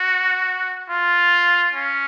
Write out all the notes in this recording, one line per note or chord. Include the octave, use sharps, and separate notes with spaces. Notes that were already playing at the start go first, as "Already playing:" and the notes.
Already playing: F#4
F4
C#4